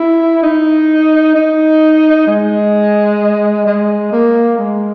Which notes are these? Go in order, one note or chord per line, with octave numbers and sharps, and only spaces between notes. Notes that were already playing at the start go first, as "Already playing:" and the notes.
Already playing: E4
D#4
D#4
G#3
G#3
A#3
G#3